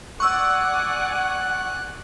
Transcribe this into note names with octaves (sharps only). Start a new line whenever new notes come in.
D5 F#5 G#5 C#6 E6 F#6